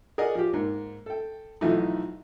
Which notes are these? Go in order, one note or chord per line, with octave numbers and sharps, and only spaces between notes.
G#4 A#4 D5 D#5 F#5
F3 G4
G#2 A#3
A4 G5
B1 E3 F3 A3 D#4